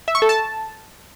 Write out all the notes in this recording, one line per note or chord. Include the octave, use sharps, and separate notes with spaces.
E5
C#6
A4
A5